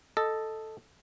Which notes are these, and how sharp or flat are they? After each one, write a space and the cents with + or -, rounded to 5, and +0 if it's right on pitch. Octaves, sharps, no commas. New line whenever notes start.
A4 +0 D#5 +0